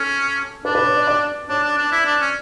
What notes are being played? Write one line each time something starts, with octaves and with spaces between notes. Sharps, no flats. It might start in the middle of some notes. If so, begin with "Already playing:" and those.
Already playing: C#4 A4
D4 B4
B4
C#5
D5
D5
D4 C#5
D4
D4
E4
D4
C#4